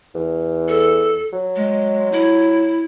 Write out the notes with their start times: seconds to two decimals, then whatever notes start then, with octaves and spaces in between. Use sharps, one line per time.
0.15 E2
0.68 A4
1.33 F#3
1.56 G#3
2.12 E4